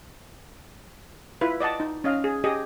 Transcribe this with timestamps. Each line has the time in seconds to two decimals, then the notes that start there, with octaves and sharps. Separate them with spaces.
1.41 E4 F4 B4
1.60 D5 D#5 F#5 A5
1.80 D#4
2.04 C#4 D#5 F5
2.24 G#4
2.44 G4 G#4 D#5